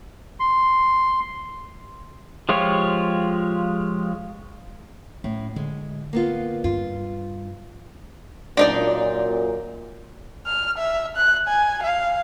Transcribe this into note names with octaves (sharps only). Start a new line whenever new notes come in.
C6
F3 G#3 F4 G4 C#5
A2 C#4
D3 G#3
A#3 B3 F4
G2 D4 F4
F#2 A#2 D4 D#4 D5
F6
E5
F#6
G#5
F5